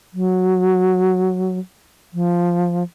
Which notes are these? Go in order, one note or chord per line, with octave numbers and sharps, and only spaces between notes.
F#3
F3